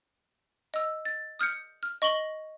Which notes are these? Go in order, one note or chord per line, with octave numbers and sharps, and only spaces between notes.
D#5 E6
A6
D#6 F6 G6 C#7
F6
D#5 C#6 A#6 F#7 G7